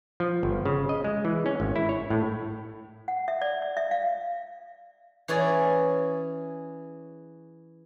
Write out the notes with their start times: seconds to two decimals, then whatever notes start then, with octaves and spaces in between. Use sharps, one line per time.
0.20 F3
0.43 G1
0.66 C#3
0.89 D#5
1.04 G#3
1.25 E3
1.46 C#4
1.60 G#1
1.76 E4
1.89 C#5
2.10 A2
3.08 F#5
3.28 E5
3.42 D5
3.62 D5
3.77 E5
3.91 F5
5.28 E3 C#4 G#4 D5 G#5